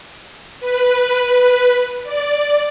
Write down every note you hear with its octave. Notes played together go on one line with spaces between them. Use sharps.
B4
D5